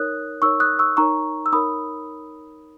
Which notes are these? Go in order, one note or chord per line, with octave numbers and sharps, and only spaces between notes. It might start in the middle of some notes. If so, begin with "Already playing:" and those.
Already playing: D#4 A#4 C#5 D#6 F#6
D#4 A#4 C#5 C#6 E6
D#6 F#6
C#6 E6
D#4 A#4 C#5 A#5 C#6
E6
D#4 A#4 C#5 B5 D#6